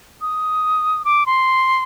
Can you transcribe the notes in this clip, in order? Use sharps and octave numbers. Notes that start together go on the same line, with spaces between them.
D#6
D6
C6